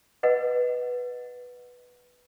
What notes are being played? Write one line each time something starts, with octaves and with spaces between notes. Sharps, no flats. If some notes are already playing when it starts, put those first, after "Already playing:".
B4 D#5 F#5